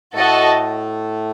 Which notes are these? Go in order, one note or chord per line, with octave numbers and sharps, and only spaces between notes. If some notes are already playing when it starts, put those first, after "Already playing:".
A2 A3 F#4 A4 D#5 A5